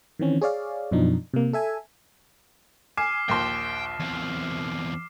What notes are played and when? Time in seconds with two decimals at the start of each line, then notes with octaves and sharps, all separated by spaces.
0.19 D#3 E3 C4 C#4
0.41 G#4 C#5 D5 F5
0.91 F#2 B2 F3 D4 D#4
1.34 C3 A#3
1.53 A4 E5 G#5
2.97 G#5 D6 F6 C7
3.29 A#1 D#2 G5 C6
4.00 E2 C4